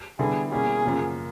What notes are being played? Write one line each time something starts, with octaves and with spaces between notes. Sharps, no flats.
D3 G3 B3 E4 G#4
B2 G3 A#3 C#4 E4 G#4
F#2 C#3 F3 A#3